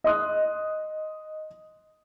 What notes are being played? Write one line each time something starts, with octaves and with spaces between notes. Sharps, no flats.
D#5 C6 D#6 F#6